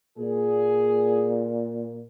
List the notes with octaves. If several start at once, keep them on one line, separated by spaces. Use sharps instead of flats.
A#2 G#4